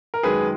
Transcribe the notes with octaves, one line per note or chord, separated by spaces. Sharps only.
A#4
F#2 D#3 G#3 G#4 B4